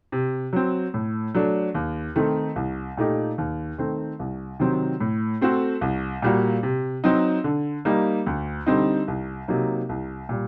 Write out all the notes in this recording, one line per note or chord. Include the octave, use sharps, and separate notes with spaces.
C3
F#3 C4
A2
F#3 A3 D4
D#2
D#3 A3 C4 D#4
C2
A#2 A3 D#4 G4
D#2
D#3 A3 C4
C2
C3 D#3 F#3 C4
A2
A3 C4 F#4 A4
C2
A#2 G3 A#3 F#4
C3
F#3 C4 D#4
D3
G3 A#3 D#4
D2
D3 G3 C4 D#4
C2
C3 F#3 A#3 D#4
C2
A#2 G3